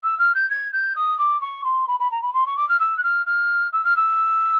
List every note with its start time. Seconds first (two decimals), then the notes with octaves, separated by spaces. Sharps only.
0.04 E6
0.19 F6
0.35 G6
0.50 G#6
0.73 G6
0.96 D#6
1.19 D6
1.41 C#6
1.64 C6
1.88 B5
2.00 B5
2.11 A#5
2.22 B5
2.34 C6
2.46 C#6
2.57 D6
2.69 F6
2.80 E6
2.97 F#6
3.03 F6
3.26 F6
3.73 E6
3.84 F6
3.96 E6